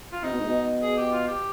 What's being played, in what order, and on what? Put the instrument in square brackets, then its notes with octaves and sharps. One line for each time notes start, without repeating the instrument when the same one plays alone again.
[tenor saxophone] F4
[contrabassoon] C3 [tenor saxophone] D#4
[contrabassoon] B2
G#2
B2
[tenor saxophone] G#4
G4
F4
G4